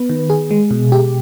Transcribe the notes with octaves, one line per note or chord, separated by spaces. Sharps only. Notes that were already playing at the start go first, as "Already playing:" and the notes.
Already playing: B3 B4
D#3
G#4
G#3
B2
G4